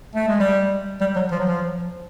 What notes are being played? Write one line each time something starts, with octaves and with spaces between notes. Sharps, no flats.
A3
G#3
G3
G3
F#3
F3
F#3
F3